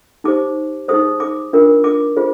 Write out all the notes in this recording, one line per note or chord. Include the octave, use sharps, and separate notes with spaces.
D#4 G4 C5 D6
D#4 G#4 C5 D#6
D6
D4 F4 A#4
D6
F4 G#4 C5